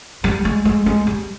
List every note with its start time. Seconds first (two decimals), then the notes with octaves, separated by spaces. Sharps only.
0.24 G3
0.45 G#3
0.65 G#3
0.86 G#3
1.07 G3